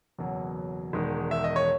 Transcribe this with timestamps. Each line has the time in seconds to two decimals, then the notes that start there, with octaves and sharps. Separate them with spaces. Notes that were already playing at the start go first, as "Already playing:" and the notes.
0.19 F#1 E2 B2 F#3
0.93 E1 E2 D#3 G#3
1.31 E5
1.44 D#5
1.56 C#5